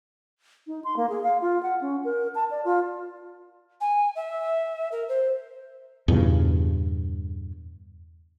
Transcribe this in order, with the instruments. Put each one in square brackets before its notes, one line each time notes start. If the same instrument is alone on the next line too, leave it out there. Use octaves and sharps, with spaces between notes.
[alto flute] D#4
C6
A#3
G#4
F5
F4
F#5
C#4
A#4
A5
D5
F4
[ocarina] G#5
E5
A#4
C5
[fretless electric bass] E2 G2 A#2 C#3